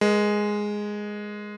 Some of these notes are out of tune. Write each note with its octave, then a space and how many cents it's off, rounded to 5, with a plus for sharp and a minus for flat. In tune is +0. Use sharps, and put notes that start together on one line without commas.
G#3 +0 A#4 +35